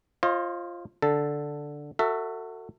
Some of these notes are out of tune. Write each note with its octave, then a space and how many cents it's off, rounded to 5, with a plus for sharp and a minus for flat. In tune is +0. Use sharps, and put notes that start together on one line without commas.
F4 -5 C5 +40 D#5 +0
D3 +0 A4 +0
F#4 +0 A4 +30 E5 +0